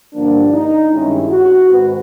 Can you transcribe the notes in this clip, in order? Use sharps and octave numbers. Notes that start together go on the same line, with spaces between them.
G2 D3 F3 A#3 D4
D#4
G2 D#3 G#3 C#4 E4
F#4
G#2 D#3 G#3 C4 B4